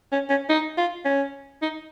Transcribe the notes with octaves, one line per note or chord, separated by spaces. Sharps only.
C#4
C#4
D#4
F4
C#4
D#4